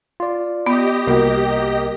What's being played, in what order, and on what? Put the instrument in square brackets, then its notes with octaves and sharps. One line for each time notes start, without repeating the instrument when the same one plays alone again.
[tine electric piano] F4 D5
[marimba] B3 [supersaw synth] G4 D#5
[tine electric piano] C2 [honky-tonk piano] A#3 F#4